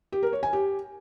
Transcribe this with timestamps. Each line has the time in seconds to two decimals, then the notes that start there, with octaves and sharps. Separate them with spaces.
0.12 G4
0.23 A#4
0.33 C#5
0.43 G#5
0.53 G4